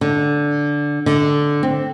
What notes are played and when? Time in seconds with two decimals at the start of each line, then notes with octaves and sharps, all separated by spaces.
0.01 D3
1.06 D3
1.63 C4